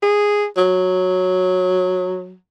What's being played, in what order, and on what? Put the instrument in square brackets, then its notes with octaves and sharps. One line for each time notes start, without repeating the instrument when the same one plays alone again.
[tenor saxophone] G#4
F#3